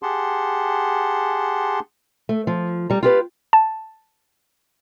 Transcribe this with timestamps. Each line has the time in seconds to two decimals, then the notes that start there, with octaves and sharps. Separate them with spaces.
0.03 G4 G#4 F#5 A5 C6
2.29 A3
2.47 F3
2.90 G3 A#5
3.03 F4 G4 B4
3.53 A5